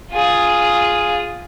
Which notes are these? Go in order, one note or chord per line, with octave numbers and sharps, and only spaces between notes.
F4 G#4